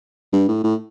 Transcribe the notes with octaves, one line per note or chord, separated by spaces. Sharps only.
G2
A2
A2